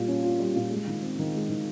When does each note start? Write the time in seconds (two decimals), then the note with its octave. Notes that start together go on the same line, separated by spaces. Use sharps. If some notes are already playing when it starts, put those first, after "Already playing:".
Already playing: A#2 G3
0.08 C#4
0.23 F4
0.40 G3
0.56 A#2
0.71 G#3
0.87 D#3
1.03 C4
1.19 D#3
1.35 G#3
1.50 D#3